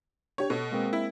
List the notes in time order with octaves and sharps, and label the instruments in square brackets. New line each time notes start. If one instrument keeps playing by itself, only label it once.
[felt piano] D4 G4 [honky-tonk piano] C#5
[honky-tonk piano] B2 [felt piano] A4
[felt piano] G#3 A#3 C4
[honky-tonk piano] E4